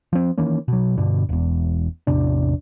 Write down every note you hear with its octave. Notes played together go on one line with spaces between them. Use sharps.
F3 C4
D#3 E3 A#3 C#4
B2 F#3
G2 B2 D3
E1 E2
A1 E2 C3 D4